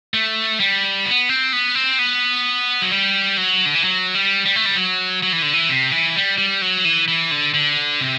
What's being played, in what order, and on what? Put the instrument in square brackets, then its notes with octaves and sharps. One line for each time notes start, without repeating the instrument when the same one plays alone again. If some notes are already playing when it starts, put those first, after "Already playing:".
[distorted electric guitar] A3
G3
B3
C4
B3
C4
B3
F#3
G3
F#3
D3
E3
F#3
G3
G3
A3
G3
F#3
F#3
E3
D3
E3
C3
E3
G3
G3
F#3
E3
E3
D3
D3
C3